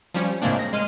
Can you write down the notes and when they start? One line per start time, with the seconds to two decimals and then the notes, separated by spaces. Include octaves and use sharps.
0.14 F3 G3 C#4
0.42 A2 C#3 G#3 A#3 C4 D4
0.59 A#6
0.73 G#3 C6 F6 D#7